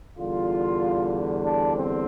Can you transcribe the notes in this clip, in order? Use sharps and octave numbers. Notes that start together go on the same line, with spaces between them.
E2 D3 G3 F4
D4
C4